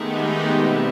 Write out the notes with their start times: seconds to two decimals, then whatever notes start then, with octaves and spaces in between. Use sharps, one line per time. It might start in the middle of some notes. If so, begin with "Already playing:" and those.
Already playing: D#3 G#3 A3 B3 D#4 G4
0.48 B2 G3 C4